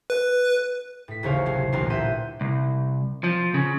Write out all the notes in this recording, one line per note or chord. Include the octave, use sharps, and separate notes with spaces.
B4
A2 B6
A1 D#2 C#3 C5 C#5 F5
C3 F#3 C7
A1 D2 A#2 B3 A#4 C7
E5 F#5 C6 G6 D#7
C2
F3
C#3